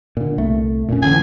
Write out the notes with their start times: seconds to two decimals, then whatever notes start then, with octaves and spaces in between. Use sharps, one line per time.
0.17 A#2 D3
0.38 C2 A3
0.89 F1 A#2 C#4
1.02 A2 D3 E3 G#5